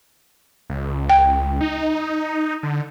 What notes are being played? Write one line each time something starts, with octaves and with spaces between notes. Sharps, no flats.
C#2
G5
D#4
D3